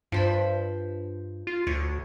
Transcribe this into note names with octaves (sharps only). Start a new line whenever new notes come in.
G2 F3 C5 B5
F4
D2 C#5